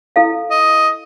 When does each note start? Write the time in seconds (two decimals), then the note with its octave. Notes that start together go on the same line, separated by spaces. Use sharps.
0.16 E4 A4 F5
0.51 D#5